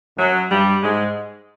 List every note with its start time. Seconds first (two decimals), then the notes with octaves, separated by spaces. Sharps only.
0.17 F#2 F#3
0.50 G2 G3
0.83 G#2 G#3